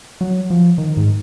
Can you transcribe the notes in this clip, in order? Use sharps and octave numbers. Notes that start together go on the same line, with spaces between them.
F#3
F3
D#3
G#2